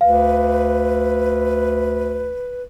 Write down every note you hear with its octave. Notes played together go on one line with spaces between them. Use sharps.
D2 B4 F5